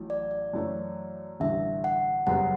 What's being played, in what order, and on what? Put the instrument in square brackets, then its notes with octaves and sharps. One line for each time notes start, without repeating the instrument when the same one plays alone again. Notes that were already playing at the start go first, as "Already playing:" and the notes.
Already playing: [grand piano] A1 A2 F#3
[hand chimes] D5
D5
[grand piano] F#2 E3 A3 C#4
[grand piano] A1 G2 D3 [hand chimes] E5
[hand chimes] F#5
[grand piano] F#1 F#2 C#3 G3 B3 [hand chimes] F#5